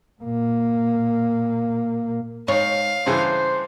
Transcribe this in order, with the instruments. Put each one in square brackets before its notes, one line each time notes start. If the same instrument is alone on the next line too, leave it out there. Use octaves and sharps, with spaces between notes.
[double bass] A#2 A#3
[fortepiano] G#2 [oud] C#5 [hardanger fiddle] F5
[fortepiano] G2 C#3 E3 [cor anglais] C5